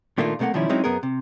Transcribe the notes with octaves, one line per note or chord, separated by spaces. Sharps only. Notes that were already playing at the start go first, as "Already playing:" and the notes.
A#2 D#3 A3 A#3 D4 F4
B1 C3 A3 A#3 F#5
B1 D#3 F3 G3 C#4 E4
F#3 G#3 C4 C#4 D#4 E4
F#2 B3 G#4 A#4
C3